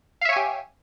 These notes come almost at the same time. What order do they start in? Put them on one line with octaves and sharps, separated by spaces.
F5 E5 C#5 G#5 G4